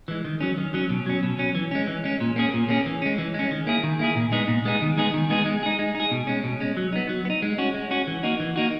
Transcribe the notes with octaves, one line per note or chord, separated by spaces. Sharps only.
E3 G#3
D#3
F#3 C#4
D#3
F#3 C#4
B2
F#3 C#4
B2
F#3 C#4
E3
G#3 C#4
E3
G#3 C#4
A#2
A#3 C#4 G#4
A#2
A#3 C#4 G#4
E3
G#3 C#4
E3
G#3 C#4
D#3
A#3 E4 G#4
D#3
A#3 E4 G#4
A#2
G#3 B3 D#4 G#4
A#2
G#3 B3 D#4 G#4
D#3
G#3 B3 D#4 G#4
D#3
G#3 B3 D#4 G#4
G#3
D#4 G#4
G#3
D#4
G#4
B2
G#3 C#4
B2
G#3 C#4
F#3
B3 D#4
F#3
B3
D#4
G#3
C#4 F#4
G#3
C#4 F#4
E3
A#3 D#4 F#4
E3
A#3 D#4 F#4